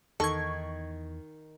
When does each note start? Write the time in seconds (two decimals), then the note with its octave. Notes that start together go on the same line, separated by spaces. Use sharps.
0.20 E2 D#3 A4 C#6 G#6